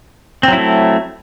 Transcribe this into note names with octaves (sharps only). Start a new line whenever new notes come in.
F#3 A3 C4 E4